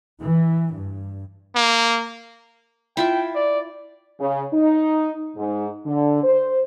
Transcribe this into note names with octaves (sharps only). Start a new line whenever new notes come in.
E3
G2
A#3
E4 F4 E5 G5
D5
C#3
D#4
G#2
D3
C5